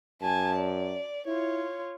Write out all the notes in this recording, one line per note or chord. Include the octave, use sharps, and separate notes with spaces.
F#2 G#5 A5
D5
E4 F4 C#5